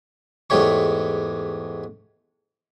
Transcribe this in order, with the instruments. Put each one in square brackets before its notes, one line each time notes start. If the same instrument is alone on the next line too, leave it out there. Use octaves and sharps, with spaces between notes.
[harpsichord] E2 G#2 A3 G4 C#5 C#6